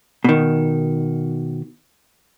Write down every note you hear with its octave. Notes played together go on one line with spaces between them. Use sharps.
B2 D#3